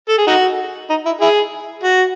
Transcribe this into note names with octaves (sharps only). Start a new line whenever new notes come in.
A4
G#4
D#4 F#4
D#4
E4
E4 G#4
F#4